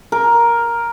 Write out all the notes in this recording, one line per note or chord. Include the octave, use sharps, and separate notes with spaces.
A#4